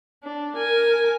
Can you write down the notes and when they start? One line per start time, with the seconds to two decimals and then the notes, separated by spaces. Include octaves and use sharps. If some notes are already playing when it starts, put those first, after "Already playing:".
0.24 D4
0.57 A#4 G#5